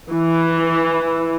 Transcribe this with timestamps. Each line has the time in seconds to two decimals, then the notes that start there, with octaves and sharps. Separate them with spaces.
0.11 E3